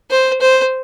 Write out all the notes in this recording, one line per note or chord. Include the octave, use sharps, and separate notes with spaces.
C5
C5